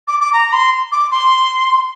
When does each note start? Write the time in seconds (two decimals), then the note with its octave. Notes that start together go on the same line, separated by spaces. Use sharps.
0.08 D6
0.20 D6
0.33 A#5
0.53 C6
0.92 D6
1.11 C6